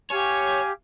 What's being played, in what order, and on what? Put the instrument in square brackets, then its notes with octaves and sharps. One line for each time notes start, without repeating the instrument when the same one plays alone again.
[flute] G4 [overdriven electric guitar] C#5 [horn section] F5 G#5